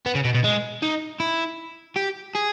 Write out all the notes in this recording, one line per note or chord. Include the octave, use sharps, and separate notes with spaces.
B3
C#3
B2
B2
G#3
D#4
E4
G4
G#4